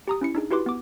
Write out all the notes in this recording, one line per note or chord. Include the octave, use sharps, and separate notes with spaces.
G4 A#5 D#6
C#4 E4 C#7
D4 D#4 G#4
E4 F#4 G4 B4 C6 D6
B3 D6